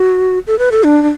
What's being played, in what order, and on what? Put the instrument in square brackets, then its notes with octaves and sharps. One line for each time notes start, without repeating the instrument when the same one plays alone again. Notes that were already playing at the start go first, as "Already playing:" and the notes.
Already playing: [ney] F#4
A4
B4
A4
D4
D4